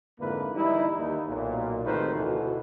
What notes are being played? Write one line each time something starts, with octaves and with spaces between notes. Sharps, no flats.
F2 G#2 D3 A#3 E4 B4
E3 G3 D#4 E4
D#2 D#3 D#4
B1 A#2
G#1 A2 C3 D#3 B4 C5
D2 B2 E3